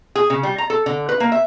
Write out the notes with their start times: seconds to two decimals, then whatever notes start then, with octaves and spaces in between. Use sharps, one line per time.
0.16 G#4
0.30 C#3
0.43 G3
0.58 A#5
0.70 A4
0.86 D3
1.09 B4
1.20 A#3
1.32 E5